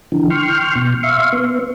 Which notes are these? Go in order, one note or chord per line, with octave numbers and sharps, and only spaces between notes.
D3 E3
G5 C6 C#6 F6
B2
E5 F5 C6 C#6
B3